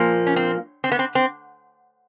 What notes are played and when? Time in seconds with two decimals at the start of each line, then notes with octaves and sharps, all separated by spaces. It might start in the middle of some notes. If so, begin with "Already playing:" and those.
Already playing: A#2 F3 A#3
0.27 C#4
0.36 C4
0.84 C4
0.92 B3
0.99 C4
1.15 C4